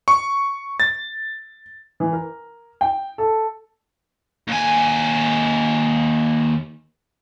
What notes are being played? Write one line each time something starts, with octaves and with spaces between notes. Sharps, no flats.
C#6
A6
E3
A#4
G5
A4
D#2 G#5